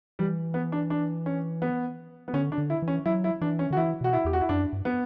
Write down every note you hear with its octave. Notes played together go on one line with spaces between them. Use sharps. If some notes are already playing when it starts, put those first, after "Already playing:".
E3 G3
B3
D4
D4
C#4
B3
B3
D3 C#4
D4
D3
E4
E3
C#4
F#3 E4
E4
E3 D4
C#4
D3 F#4
E3 E4
B2 F#4
E4
E2 G4
F#4
E4
F#2 D4
G2
B3